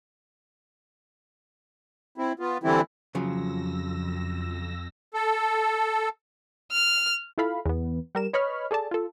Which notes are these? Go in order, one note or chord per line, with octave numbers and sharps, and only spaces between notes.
C4 E4
B3 F4
D3 E3 G3 C4 E4
F2 C#3 F3 F#3 E6 A#6
A4
F6
E4 F4 A4 F5 B5
E2 B3
G3 A#4 E7
B4 C#5 D#5 B5 C#6 F6
G#4 A4 D5 A5
F4 A4